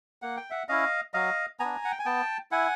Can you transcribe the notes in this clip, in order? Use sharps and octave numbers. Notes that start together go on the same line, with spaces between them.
A#3 F#5
G5
E5 F#5
C#4 E4 D#5 F5
F#3 D#5 F5
B3 D4 G#5 A#5
F#5
G5
G#5
B3 G5 A5
E4 F#5 G#5